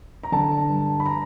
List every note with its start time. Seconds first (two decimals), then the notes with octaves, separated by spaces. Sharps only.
0.23 A#5
0.32 D3 A5
0.69 G2
1.00 B5
1.06 A#5